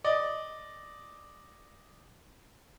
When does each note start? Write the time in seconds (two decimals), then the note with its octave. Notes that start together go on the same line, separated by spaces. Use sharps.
0.04 D5 D#5